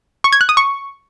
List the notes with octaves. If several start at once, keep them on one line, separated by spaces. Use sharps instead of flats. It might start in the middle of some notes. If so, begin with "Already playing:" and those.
C#6
G#6
F#6
D#6
C#6